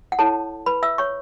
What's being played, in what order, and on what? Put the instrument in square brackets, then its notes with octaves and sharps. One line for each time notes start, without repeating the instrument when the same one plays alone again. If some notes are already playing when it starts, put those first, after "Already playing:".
[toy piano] F#5
E4 A4 C#5 A5
B4 B5
E5 E6
C#5 C#6